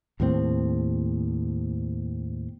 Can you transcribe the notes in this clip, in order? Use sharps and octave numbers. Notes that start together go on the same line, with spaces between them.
D#2 A2 A#3 C4